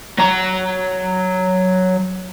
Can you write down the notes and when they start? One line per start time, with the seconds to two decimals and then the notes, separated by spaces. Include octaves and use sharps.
0.18 F#3 A#5